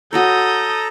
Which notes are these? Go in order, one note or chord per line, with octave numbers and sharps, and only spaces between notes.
F#4 A4 B4 C#5 A#5 D#6 G6